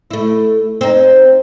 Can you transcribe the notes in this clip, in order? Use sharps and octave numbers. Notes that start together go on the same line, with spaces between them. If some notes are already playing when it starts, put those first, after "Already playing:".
A3 E4
C4 D#4